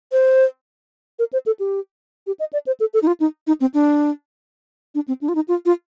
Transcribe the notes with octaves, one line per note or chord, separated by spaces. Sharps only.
C5
A#4
C5
A4
G4
G4
D#5
D5
C5
A4
A4
D#4
F4
D#4
D#4
C4
D4
D4
C4
D4
F4
D#4
F4
F4